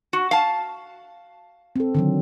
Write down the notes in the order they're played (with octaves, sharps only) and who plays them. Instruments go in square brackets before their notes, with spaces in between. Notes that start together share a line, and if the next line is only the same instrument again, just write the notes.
[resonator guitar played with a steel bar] F#4
F5 A5
[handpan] C4 A4
D3 D#3 F#3